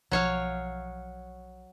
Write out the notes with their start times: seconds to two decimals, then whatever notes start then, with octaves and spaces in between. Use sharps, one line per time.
0.11 B1 F3 F#3 C#5 F5